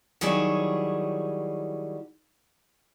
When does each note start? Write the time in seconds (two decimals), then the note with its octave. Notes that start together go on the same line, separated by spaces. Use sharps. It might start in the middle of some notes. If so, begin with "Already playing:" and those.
0.21 D#3 F#3 G3 E4 G#4 C#5